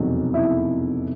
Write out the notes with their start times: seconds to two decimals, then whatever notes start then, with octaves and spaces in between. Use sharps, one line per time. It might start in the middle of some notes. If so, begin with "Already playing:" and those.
Already playing: F1 E2 B2 F#3 D#4
0.34 E4